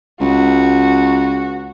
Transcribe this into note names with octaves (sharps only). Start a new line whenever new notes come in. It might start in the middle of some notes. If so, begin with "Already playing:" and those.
C#2 F#4